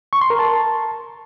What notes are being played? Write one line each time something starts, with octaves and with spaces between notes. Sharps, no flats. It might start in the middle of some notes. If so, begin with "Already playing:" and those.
C#6
C6
A#4
A5